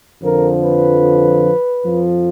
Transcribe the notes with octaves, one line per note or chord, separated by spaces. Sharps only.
F2 D3 F3 A#4
B4
F2 F3